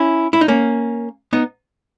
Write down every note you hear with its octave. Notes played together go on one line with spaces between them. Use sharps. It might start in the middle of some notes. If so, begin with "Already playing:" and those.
Already playing: C#4 E4
E4
D#4
A#3 C#4
B3 D#4